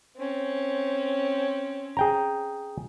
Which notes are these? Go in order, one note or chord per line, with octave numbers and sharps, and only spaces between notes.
C4 C#4
G#4 G5 A#5